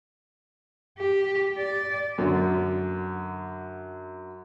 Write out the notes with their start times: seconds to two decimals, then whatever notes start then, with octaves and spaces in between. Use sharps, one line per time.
0.99 G4
1.58 D5
2.18 F#2 D3